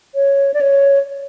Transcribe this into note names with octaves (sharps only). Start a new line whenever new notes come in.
C#5
D5
C#5